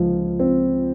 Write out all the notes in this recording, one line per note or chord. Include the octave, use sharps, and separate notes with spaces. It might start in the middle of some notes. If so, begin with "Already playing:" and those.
Already playing: C#2 F3
C4